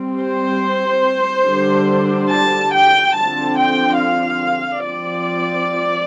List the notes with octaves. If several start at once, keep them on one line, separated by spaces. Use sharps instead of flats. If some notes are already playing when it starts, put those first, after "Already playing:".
Already playing: G3 C4
C5
D3 G3 D4
A5
G5
D3 F3 C4 A5
G5
F5
F3 C4 D5